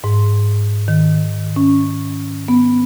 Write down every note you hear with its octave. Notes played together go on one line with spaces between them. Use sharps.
G#2
D#3
C#4
B3